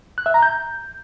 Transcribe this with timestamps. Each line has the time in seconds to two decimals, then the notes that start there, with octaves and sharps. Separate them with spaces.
0.18 F#6
0.26 E5
0.34 A#5
0.42 G6